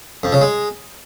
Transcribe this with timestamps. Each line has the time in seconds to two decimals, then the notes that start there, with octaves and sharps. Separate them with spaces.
0.23 F2
0.32 C#3
0.41 G#3